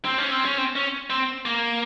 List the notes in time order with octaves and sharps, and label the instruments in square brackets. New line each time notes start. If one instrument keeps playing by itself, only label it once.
[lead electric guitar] C4
C#4
C4
C#4
C4
C#4
C4
A#3